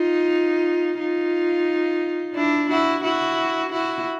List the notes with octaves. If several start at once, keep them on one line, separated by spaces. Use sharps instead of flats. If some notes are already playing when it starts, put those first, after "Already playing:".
Already playing: D#4 F4
D#4 F4
D4 E4
E4 F#4
E4 F#4
E4 F#4